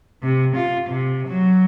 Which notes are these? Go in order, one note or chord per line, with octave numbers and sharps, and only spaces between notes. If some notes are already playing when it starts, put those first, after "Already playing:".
C3
F4
C3
F#3